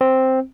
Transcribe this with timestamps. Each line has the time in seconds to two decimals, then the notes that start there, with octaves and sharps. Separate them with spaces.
0.01 C4